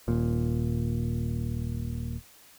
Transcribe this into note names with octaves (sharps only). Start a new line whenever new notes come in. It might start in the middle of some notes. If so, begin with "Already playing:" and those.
D#1 A#2